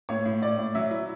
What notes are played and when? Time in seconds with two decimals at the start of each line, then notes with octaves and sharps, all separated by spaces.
0.09 A2 C#5
0.25 A2
0.42 A2 D5
0.59 A2
0.75 F#3 E5
0.91 E4